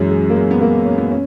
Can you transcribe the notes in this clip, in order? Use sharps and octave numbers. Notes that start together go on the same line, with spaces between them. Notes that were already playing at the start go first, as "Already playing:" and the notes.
Already playing: F#2 E3 F#3 G#3
G#3
A#3
G#3
B3
A#3
C#4
B3
C#4